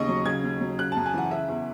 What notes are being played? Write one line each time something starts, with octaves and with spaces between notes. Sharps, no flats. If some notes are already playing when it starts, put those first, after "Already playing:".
Already playing: D#2 C#3 D#5 C#6
F#3
C#3 G#6
D#2
F#3
C#3 F#6
A5
F#2
G#5
E3 F#5
C#3 E5
E2